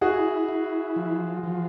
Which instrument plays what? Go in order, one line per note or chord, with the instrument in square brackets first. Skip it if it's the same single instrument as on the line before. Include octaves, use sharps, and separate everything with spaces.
[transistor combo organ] E4 [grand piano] F#4 G#4
[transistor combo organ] E4
F3
F3